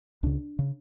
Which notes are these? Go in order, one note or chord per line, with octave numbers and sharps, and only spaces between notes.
C#2 C#3 D4
C#3